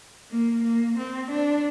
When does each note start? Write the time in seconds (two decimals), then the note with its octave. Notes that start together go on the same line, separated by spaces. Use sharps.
0.31 A#3
0.64 A#3
0.97 C4
1.31 D4